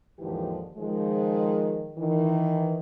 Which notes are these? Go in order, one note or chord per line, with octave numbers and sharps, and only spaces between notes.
D#2 G#2 D3 E3 F3 G4
D#3 F3 G#3
D#3 E3